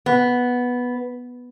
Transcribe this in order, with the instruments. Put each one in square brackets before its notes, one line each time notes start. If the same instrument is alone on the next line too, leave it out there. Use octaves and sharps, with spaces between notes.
[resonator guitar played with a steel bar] B3